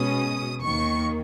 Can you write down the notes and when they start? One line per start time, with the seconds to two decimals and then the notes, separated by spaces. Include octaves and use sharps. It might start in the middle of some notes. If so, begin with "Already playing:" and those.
Already playing: B2 G#3 C#4 D#6
0.61 D#2 D#3 A#3 C#6